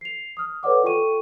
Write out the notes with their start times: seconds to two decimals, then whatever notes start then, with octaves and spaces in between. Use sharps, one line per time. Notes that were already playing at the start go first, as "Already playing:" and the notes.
0.01 C7 F7
0.37 D#6 F6
0.63 A4 B4 C#5 D5 F#5 D6
0.84 F4 A4 G5 C#6 D#7